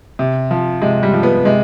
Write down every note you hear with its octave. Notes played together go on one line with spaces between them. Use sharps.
C3
F3
C3 G#3
G3
F3
B3
C3 G#3